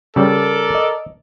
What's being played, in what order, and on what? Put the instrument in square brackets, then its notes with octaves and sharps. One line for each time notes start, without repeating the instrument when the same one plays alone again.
[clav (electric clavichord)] C#3 G3 [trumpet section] A4 A#4 D5
[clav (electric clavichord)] D#5